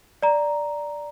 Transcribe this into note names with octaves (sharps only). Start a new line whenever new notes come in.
D5 A#5